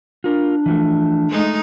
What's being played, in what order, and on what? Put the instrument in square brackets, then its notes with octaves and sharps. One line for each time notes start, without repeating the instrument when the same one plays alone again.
[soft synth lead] D4 [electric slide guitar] F4 A#4
[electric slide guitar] E3 F3 A3
[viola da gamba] G#3 A3 D#4